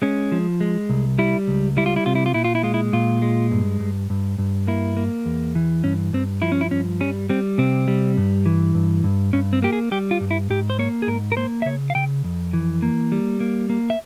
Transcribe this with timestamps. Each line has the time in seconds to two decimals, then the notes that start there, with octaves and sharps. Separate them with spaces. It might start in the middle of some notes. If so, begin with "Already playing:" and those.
0.02 G#3 C#4
0.32 F3
0.61 G#3
0.89 C2
1.19 G3 E4
1.48 C#2
1.77 G3 E4
1.86 F4
1.96 E4
2.06 C3 F4
2.15 E4
2.26 F4
2.34 A#2 E4
2.45 F4
2.55 E4
2.63 G#3 F4
2.74 E4
2.93 A#2 F4
3.22 G#3
3.52 G2
3.80 G2
4.10 G2
4.38 G2
4.67 A#3 E4
4.97 A#3
5.26 E2
5.55 E3
5.84 G2 C#4
6.13 G2 C4
6.42 F3 E4
6.52 C#4
6.61 E4
6.71 G2 C#4
7.00 G3 C#4
7.29 G3 C4
7.58 C3 C4
7.88 G3
8.17 G2
8.46 E3
8.75 G2
9.04 G2
9.33 G2 C#4
9.53 C4
9.62 A#3 G4
9.73 G#4
9.91 G3 G4
10.11 F4
10.21 G2
10.31 E4
10.50 G#2 G4
10.70 C5
10.79 A#3 C#5
11.02 G#4
11.07 G#2 A#4
11.32 A#4
11.37 A#3 C5
11.62 E5
11.65 C#3 C#5
11.90 F5
11.95 C#3 G5
12.24 F2
12.53 E3
12.82 A#3
13.12 G3
13.40 A#3
13.70 A#3
13.90 E5